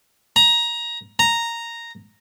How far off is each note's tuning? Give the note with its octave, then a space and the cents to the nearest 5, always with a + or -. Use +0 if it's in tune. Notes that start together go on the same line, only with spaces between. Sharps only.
A#5 +20
A#5 -5